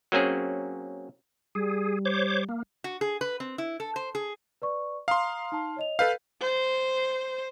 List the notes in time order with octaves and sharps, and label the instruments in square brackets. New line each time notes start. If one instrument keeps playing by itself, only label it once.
[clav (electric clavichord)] F#3 A#3 C4 C#4 G#4
[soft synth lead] G3 [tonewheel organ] G#4
[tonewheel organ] C5 C#5 D6
A#3
[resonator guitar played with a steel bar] F#4
G#4
B4
C4
E4
A4
C5
G#4
[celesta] B4 D5 C#6
[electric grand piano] F5 C6 [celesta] A#5 D#6
[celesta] D#4 A5
C#5 D#5 F7
[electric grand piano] A4 B4 F5 [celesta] G6
[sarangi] C5